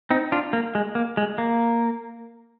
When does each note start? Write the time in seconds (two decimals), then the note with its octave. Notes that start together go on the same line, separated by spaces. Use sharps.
0.11 C4 D#4
0.32 D4 F4
0.53 A#3
0.75 G#3
0.95 A#3
1.17 G#3
1.38 A#3